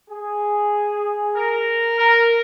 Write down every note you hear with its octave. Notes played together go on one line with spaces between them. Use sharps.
G#4
A#4
A#4